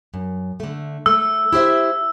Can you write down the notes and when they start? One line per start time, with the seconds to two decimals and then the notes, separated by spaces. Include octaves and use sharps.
0.14 F#2
0.60 D3 A3
1.06 A3 E6
1.52 E4 G4 C5 E5